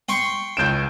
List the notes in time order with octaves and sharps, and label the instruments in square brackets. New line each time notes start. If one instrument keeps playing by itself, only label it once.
[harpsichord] G5 C6 C#6
[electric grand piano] C#2 C#4 D7 [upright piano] G6 E7